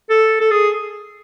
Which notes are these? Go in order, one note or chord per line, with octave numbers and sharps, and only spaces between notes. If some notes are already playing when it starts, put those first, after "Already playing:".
A4
A4
G#4